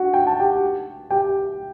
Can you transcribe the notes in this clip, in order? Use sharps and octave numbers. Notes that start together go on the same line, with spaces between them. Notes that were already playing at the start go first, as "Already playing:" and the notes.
Already playing: F#4 F#5
G5
A5
G4 G5
G4 G5